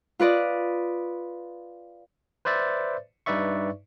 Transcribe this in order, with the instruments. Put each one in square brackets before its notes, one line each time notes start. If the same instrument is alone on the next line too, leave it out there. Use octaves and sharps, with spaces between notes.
[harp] F4 B4 D5 D#5
[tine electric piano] B4 C5 D5 E5 A6
G2 D#4 B4 D5 E5 C#6